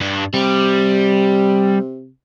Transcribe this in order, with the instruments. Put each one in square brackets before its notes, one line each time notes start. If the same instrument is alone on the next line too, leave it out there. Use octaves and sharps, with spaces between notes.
[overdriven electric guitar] G2 D4
[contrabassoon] C3 [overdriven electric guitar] G3